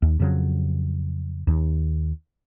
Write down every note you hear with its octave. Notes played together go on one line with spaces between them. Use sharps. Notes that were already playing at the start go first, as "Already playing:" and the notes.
D#2
F2 C#3 F#3
D#2